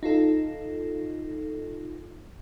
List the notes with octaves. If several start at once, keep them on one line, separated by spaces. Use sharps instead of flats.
D#4 F4 A4